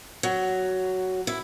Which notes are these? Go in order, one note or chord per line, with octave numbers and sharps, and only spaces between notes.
F#3
E4